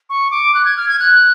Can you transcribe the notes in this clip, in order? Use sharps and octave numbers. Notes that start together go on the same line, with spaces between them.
C#6
D6
F#6
G#6
F6
G#6
F#6